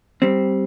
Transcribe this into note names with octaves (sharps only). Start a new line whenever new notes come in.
G3 C4